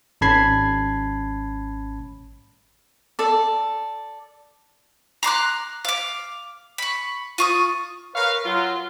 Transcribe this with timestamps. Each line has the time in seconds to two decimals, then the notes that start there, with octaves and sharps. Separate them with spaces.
0.21 G#1 C#4 A5 B5 G#6 C7
3.19 A4 D5
5.23 A#5 C6 D6 F#6
5.85 F5 D6
6.78 B5 C#6
7.38 F4 C#6 D#6
8.15 A#4 B4 C#5 F5
8.45 F#3 F4